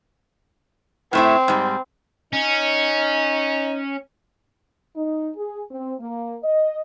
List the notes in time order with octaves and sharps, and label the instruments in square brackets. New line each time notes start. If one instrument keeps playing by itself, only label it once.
[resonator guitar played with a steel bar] A2 A3 E4 [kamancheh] C4
[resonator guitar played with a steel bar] G#2 G3
[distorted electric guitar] C#4 [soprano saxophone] D#4
[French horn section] D#4
G#4
C4
A#3
D#5